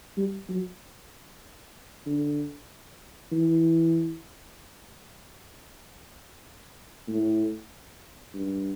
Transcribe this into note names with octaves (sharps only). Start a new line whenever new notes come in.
G3
F#3
D3
E3
A2
G2